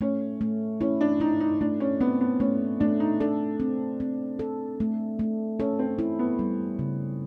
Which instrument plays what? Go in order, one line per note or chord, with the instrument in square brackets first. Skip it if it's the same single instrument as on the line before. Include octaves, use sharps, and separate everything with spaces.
[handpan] A3 [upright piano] C#4
[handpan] A3
[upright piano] C#4 [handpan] E4
[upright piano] D4
[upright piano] D#4 [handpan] E4
[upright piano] D#4
[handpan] A3 [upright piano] D4
[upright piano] C#4
[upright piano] B3 [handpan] C4
[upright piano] B3
[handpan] A3 [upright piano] C#4
[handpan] A3 [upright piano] D4
[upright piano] D#4
[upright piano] D4 [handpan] A4
[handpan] C4
C4
A4
A3
A3
[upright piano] C#4 [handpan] A4
[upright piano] C4
[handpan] E4
[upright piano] B3
[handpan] G3
C#3